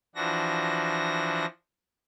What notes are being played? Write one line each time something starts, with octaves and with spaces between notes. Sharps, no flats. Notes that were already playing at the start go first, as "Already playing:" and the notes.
E3 F3 D4 F#4 A#6